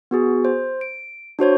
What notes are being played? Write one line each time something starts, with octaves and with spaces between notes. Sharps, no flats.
B3 F#4 G#4
C5
D7
D4 F#4 C5 C#5